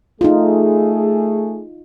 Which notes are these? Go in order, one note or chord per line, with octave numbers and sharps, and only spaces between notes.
A3 D#4 F4 G#4